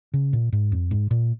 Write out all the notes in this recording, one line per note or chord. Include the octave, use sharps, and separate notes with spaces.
C#3
A#2
G#2
F2
G#2
A#2